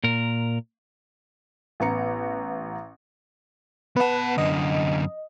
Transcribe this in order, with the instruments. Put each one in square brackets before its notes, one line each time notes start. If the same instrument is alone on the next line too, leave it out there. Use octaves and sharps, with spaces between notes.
[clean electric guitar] A#2 A#4
[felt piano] A1 B3 A#5 C#7
[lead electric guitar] B3 A5 [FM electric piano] B4 F#5
[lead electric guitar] F#2 D3 [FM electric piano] D#5